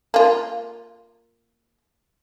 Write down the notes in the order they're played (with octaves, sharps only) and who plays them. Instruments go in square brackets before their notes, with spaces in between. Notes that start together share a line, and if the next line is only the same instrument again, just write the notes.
[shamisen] A#3 F4